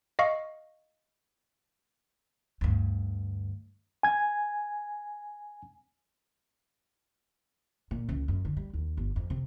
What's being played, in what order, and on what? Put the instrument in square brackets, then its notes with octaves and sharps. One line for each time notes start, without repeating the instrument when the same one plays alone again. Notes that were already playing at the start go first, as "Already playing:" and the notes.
[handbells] D#5 F5 C#6
[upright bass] D2 G2
[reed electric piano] G#5 G#6
[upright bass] A#2
C#2
F#2
D3
G3
D#2
G1
F2
C3